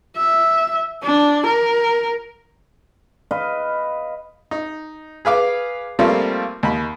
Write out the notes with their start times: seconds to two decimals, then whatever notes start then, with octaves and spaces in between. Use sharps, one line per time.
0.17 E5
1.03 D4
1.47 A#4
3.31 B4 D#5 F5
4.51 D#4
5.25 G#4 B4 F5 D6
5.99 F3 G3 A3 A#3 C4 F4
6.63 D#2 B5